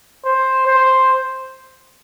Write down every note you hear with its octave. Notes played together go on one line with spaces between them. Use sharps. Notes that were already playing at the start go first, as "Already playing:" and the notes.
C5
C5